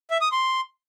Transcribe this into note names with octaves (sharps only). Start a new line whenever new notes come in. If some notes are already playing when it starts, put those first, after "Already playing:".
E5
D#6
C6